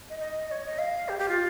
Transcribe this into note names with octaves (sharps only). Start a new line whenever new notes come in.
D#5
D#5
C#5
D#5
F5
G4
G4
F4